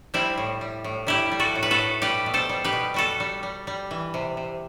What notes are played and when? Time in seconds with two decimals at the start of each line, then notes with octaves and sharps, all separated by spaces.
0.14 G3 C4 E4
0.38 A2
0.61 G3
0.84 A2
1.07 G3 E4 G4
1.32 G3
1.40 F#4 A4
1.55 A2
1.63 B4
1.71 F#4 A4
1.79 A2
2.02 G3 G4 B4
2.26 B2
2.34 A4 C5
2.49 G3
2.64 G4 B4
2.73 B2
2.94 G3 F#4 A4
3.20 G3
3.43 G3
3.67 G3
3.91 E3
4.14 C3
4.37 C3